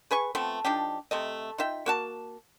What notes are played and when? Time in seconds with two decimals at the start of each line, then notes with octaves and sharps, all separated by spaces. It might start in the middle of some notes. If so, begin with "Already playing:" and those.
0.11 G#4 B4 G#5 C#6
0.35 F3 A3 B3 C4
0.65 F3 D4 D#4 G4
1.11 C3 A3 D#5
1.58 D#4 F4 E5 G5
1.86 A#3 F#4 A5